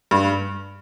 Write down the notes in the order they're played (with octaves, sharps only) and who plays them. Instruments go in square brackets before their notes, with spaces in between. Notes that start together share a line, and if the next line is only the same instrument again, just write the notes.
[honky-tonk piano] G2